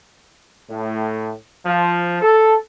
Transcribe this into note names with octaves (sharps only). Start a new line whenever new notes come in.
A2
F3
A4